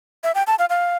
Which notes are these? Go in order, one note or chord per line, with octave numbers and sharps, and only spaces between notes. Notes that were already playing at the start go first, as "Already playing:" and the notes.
E5
G5
A5
F5
F5